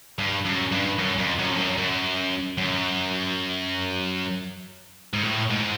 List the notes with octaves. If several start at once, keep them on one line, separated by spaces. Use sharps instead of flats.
G2
F#2
G2
F#2
F2
F#2
F2
F#2
F#2
F#2
G#2
A2
G#2